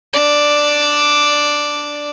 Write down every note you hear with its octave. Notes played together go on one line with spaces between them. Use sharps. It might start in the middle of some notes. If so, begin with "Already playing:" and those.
D4 D5